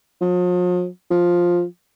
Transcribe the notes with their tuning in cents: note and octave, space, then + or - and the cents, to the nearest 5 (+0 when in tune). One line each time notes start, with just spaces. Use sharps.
F3 +45
F3 +5